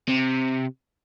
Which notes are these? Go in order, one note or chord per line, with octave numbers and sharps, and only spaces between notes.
C3